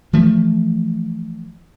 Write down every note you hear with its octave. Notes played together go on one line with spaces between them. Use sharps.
E3 F3 A3